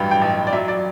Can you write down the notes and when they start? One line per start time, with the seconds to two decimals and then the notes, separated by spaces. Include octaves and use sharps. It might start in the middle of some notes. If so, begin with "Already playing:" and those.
Already playing: A1 G2 F#3 G5
0.11 G5
0.22 A1
0.47 D5
0.53 F#3 E5
0.68 D5